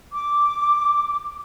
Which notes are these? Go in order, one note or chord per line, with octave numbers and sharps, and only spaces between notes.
D6